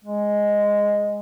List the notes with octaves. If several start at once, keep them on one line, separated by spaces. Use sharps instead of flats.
G#3